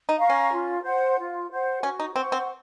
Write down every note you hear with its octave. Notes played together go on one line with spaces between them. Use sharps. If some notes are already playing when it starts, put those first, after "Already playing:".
D#4
F5 A#5 C#6
C#4
F4
C5 F#5
F4
C5 F#5
C#4 F#4
D#4
C4 C5 F#5 C#6
C4